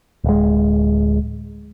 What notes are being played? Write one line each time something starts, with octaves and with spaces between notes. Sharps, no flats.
D1 G#3